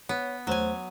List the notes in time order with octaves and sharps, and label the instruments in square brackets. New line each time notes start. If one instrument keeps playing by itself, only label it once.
[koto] B3 [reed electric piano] C#5
[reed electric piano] E2 A3 C5 [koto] F#3 G#5